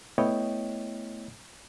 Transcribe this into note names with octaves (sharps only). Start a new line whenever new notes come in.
A3 B3 E4 C#5 D#5 G5